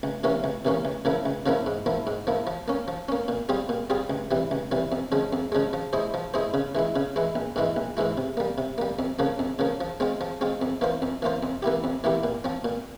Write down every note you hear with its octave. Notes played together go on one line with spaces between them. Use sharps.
C#2
C3 E3 A#3 C#4
C#2
C3 E3 A#3 C#4
C#2
C#3 F3 A#3 E4
C#2
C#3 F3 A#3 E4
G#2
F3 A#3 E4
G#2
F3 A#3 E4
F3
A#3 C#4
F3
A#3 C#4
A#2
G3 C4 F4 G#4
A#2
G3 C4 F4 G#4
C#2
C3 E3 G3
C#2
C3 E3 G3
F2
C#3 F3 G#3
F2
C#3 F3 G#3
F3
G#3 E4 G#4 C5
F3
G#3 E4 G#4 C5
C#3
E3 G#3 E4
C#3
E3 G#3 E4
A#1
G#2 E3 G#3 E4
A#1
G#2 E3 G#3 E4
C3
G3 A#3
C3
G3 A#3
F2
C#3 F3 A#3
F2
C#3 F3 A#3
F3
G#3 C4 F4
F3
G#3 C4 F4
F2
E3 A#3 F4 C5
F2
E3 A#3 F4 C5
F2
E3 A#3 E4 G4
F2
E3 A#3 E4 G4
A#2
F3 C4
A#2